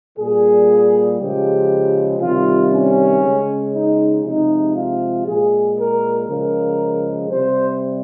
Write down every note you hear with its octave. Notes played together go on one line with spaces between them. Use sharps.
A#2 G3 G#4
C#3 F3 G#3 G4
C3 D#3 G3 F4
C#4
C#3 G#3
D#4
C3 F3 G#3 D#4
F4
A#2 G#3 G#4
A#4
C#3 F3 G#3 A#4
C3 G3 C5